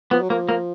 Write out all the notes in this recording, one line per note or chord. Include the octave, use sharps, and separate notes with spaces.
F3 B3
F#3
F3 A#3
A#3